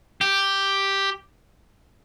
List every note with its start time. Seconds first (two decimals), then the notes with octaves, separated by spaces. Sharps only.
0.21 G4